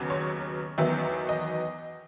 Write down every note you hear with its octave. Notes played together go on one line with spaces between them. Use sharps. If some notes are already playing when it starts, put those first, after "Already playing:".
Already playing: D#2 C#3 F#3 B3
C#5
E2 D#3 F#3 B3 E5
D#5